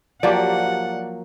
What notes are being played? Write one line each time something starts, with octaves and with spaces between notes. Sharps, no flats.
F3 F#3 A#3 G4 D5 F#5